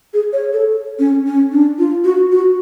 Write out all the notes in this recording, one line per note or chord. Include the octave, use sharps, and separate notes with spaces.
G#4
C#5
A4
C#4
C#4
D4
F4
F#4
F#4